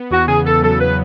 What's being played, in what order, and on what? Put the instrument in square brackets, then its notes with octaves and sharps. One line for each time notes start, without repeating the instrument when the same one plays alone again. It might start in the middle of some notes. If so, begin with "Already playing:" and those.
Already playing: [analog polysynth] B3
[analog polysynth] E2 [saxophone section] F#4
[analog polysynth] C#3 [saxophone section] G#4
[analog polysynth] E2 [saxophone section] A4
[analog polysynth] F#3 [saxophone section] A4
[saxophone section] B4